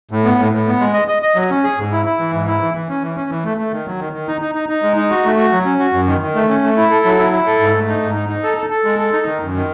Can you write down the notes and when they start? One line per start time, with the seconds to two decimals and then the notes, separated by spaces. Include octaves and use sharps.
0.11 A2
0.25 B3
0.39 A2
0.53 A2
0.67 B3
0.80 G#3
0.94 D#5
1.08 D#5
1.23 D#5
1.35 F#3
1.50 C#4
1.64 G#4
1.78 G#2
1.92 E4
2.06 E4
2.19 E3
2.32 G#2
2.47 E4
2.61 E3
2.74 E3
2.89 C#4
3.02 E3
3.17 C#4
3.30 E3
3.44 A3
3.57 A3
3.72 D#3
3.86 F#3
3.99 D#3
4.13 D#3
4.28 D#4
4.41 D#4
4.55 D#4
4.69 D#4
4.83 G#3
4.97 D#4
5.10 F#4
5.25 A3
5.37 F#4
5.52 F#3
5.65 C#4
5.79 F#4
5.93 F#2
6.07 D#3
6.21 D#3
6.35 A3
6.48 C#4
6.63 A3
6.77 E4
6.90 A4
7.05 F#3
7.18 E4
7.32 E4
7.46 A4
7.59 G#2
7.74 A3
7.88 D#4
8.02 G#2
8.15 D#4
8.29 D#4
8.43 A4
8.57 A4
8.70 A4
8.85 G#3
8.99 A4
9.13 D#4
9.26 D#3
9.41 F#2
9.54 D#3